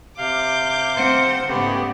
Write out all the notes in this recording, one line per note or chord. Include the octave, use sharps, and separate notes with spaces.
C3 F5 D6 G6
C4 C5 F#5
G#2 C#3 A3 B3 G4